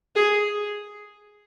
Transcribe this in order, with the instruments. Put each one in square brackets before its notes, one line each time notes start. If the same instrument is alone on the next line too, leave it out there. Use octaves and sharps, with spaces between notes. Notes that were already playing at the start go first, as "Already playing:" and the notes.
[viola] G#4